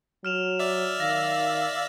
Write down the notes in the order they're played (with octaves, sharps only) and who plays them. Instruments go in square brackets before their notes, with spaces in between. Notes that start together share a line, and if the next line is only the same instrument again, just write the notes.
[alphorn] F#3 [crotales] F6 E7 F7
[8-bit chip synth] D5 E5
[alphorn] D#3 [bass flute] F5 [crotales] A#6